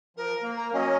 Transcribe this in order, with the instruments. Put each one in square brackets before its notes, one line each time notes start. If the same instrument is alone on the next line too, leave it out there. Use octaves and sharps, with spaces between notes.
[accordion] F3 [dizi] A#4
[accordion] A#3
[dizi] A#5
[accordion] F#3 C#4 [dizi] D#5